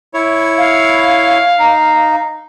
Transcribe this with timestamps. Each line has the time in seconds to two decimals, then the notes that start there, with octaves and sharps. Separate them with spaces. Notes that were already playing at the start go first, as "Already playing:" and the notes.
0.14 E4 C#5
0.58 F5
1.59 D#4